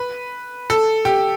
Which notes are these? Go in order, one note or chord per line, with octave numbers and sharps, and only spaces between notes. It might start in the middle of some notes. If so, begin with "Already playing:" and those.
Already playing: B4
A4
G4